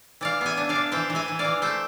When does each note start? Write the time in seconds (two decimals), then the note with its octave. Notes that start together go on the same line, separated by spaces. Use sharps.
0.21 E3 D5 F5
0.41 B3 E5 G#5
0.57 D4
0.69 D5 F5
0.75 D4
0.92 E3 C5 E5
1.10 E3
1.15 E5 G#5
1.28 E3
1.39 D5 F5
1.45 E3
1.62 A3 C5 E5